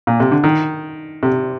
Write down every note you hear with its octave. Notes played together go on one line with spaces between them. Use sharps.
A#2
C3
D3
D#3
C3